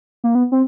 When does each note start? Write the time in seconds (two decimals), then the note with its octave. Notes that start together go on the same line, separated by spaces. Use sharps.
0.24 A#3
0.35 B3
0.52 C4